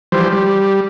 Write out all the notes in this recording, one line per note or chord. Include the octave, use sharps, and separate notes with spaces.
E3 F3 G3 C5
G3